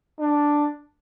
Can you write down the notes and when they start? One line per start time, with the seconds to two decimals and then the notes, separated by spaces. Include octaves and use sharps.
0.19 D4